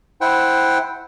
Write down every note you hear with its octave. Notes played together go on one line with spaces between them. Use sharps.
E4 C5 F#5 G5